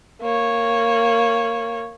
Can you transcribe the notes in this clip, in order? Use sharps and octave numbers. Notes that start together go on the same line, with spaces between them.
A#3 C#5